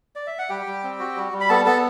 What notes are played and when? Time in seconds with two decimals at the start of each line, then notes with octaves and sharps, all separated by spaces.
0.16 D5
0.27 E5
0.39 F#5
0.49 G3 G4 G5
0.66 G3
0.84 C4
0.99 F#4
1.16 G3
1.33 G3
1.41 B5
1.49 B3 A4 A5
1.66 B3 A4 A5